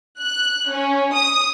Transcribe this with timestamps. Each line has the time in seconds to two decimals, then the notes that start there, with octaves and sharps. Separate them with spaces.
0.20 F#6
0.70 C#4
1.14 D#6